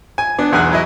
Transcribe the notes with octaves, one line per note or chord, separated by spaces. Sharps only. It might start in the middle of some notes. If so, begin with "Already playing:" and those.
G#5
B3 D4
B1 E2 G#4 G#5 F#6
F#3 E4 D#5